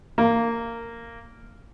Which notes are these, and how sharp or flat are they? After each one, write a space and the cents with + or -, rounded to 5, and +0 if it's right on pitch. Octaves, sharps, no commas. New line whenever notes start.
A#3 -15